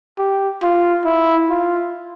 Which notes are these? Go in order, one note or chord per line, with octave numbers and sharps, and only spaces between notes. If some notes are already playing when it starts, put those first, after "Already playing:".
G4
F4
E4
F4